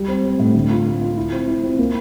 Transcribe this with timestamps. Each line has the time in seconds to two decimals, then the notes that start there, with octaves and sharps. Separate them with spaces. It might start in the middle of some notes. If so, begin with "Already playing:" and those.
Already playing: G3
0.08 C4
0.24 C4
0.39 A2
0.55 D3
0.70 F4
0.86 F4
1.01 F4
1.17 E4
1.32 C4
1.48 E4
1.64 C4
1.79 A#3